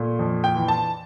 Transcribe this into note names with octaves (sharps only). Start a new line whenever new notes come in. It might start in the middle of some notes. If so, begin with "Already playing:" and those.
Already playing: A#2 A3
F2
G5
E3
A5